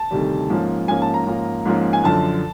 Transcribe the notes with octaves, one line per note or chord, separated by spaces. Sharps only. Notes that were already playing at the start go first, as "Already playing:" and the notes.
Already playing: A5
D2 C3 D#3 G3
G#2 F3 A#3 C#4
G#2 F3 A#3 C#4 G#5
A5
A#5
G#2 F3 A#3 C#4
G#2 F3 A#3 C#4
G#5
F#2 D3 F3 A5